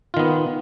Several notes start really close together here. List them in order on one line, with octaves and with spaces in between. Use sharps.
F4 D#3 B3